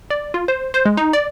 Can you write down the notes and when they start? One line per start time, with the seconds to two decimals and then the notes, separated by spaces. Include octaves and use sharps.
0.11 D5
0.34 F4
0.48 C5
0.74 C5
0.85 G#3
0.97 D#4
1.13 D5